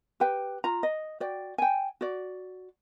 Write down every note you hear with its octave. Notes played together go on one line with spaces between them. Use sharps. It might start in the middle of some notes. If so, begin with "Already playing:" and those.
G4 B4 G5
F4 A#5
D#5
F#4 D5 G5
G5 G#5
F#4 D5